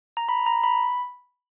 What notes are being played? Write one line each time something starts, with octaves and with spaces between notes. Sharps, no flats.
A#5
B5
A#5
B5